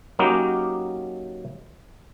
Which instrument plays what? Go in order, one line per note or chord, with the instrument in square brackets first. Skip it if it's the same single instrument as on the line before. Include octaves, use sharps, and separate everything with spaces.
[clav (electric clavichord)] F#3 A#3 C#4 D#4 F#4 G4